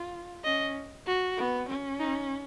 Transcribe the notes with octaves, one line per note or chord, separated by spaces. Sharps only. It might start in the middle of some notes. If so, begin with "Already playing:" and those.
Already playing: F4
C#4 D#5
F#4
B3
C#4
D#4